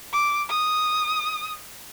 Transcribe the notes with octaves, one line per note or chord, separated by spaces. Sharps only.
D6
D#6